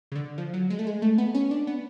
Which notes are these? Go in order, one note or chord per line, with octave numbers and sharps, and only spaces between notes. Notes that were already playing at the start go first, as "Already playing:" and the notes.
C#3
D3
F3
F#3
G#3
A3
G#3
A3
B3
C#4
D4
B3